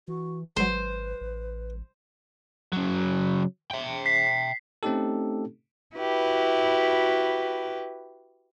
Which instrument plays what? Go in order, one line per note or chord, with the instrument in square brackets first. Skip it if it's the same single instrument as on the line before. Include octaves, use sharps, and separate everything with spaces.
[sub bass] E3 [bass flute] F#4
[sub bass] G#1 [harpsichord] F#3 G#3 [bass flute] B4 [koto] C5
[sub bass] A1
[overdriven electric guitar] C#3 F#3
E5 G5
[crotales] B6 C7
[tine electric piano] A3 C4 C#4 D#4 G4 A4
[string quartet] E4 F#4 G4 B4